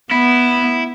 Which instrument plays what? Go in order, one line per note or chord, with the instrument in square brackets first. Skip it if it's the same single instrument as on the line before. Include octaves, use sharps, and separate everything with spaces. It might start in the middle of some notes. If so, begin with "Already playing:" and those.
[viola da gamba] B3 [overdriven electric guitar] E4